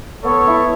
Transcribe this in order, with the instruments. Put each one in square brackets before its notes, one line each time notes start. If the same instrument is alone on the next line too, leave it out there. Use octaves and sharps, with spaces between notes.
[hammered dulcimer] B3 [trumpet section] A4 C#5
[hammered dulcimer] E4